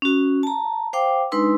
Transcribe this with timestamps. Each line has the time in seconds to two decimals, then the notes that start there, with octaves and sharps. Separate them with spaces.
0.02 C#4 F#4
0.43 A5 A#5
0.93 C5 F5 G5 D6
1.32 G#3 D4 D#4 B4 C6 E6